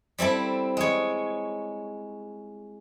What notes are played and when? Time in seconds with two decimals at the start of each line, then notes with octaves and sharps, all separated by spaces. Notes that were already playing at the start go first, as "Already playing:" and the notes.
0.18 G3 C4 E4 A4
0.77 G#3 C#5